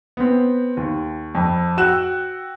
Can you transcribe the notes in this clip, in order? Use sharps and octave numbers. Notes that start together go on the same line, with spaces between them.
B3 C4
D#2
F2
F#4 G5 E6 F#6 E7